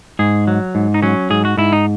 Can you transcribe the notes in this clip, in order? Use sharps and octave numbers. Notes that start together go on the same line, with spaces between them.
G#2 G#4
F#3
G#2
D#4
F#3 C#4
G#2 G#4
F#4
G#2 E4
D#4